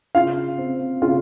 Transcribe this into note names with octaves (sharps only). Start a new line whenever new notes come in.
C#3 F4 F5
C4
C#3 F4 F5